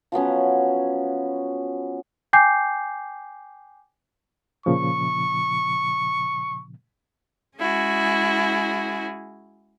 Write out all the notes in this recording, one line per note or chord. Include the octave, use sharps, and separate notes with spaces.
F3 F#3 B3 C#4
G5 G#5 D6 G6 C7
A#2 C#3 F3 C#6
G#3 C#4 E4 F#4 G#4